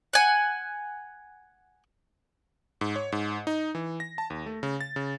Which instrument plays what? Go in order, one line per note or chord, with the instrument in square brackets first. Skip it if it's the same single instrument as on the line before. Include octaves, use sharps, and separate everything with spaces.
[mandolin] F#5 G#5
[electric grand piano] G#2
C#5
G#2
D#4
E3
A#6
A5
D#2
A3
C#3
A6
C#3